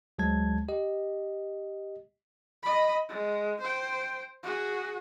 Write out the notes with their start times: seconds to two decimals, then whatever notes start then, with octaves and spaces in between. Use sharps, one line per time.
0.18 D2 F#3 G#3 A5 G#6
0.68 G4 D#5
2.63 D#5 B5
3.09 G#3
3.61 C5 G5
4.43 F#4 G#4